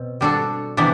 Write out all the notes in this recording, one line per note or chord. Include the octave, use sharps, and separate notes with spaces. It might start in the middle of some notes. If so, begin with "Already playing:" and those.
Already playing: B2 C4
G3 D4 F#4 A4
C3 E3 B3 D4